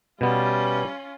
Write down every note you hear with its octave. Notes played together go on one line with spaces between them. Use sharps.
B2 G3 B3 C#4 F4